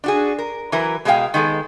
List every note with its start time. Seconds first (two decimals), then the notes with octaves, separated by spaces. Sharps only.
0.04 D4 F#4 G#4
0.39 A#4
0.72 E3 F#3 A#4 B4
1.05 B2 G#3 G#4 A#4 F5 G5
1.34 D#3 G#3 B3 A4